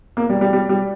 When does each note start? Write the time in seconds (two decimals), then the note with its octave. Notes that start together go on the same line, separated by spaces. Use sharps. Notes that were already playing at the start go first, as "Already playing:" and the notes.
0.17 A#3
0.30 G3
0.41 G3
0.53 G3
0.69 G3